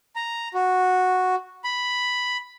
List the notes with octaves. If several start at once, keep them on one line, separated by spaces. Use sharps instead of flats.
A#5
F#4
B5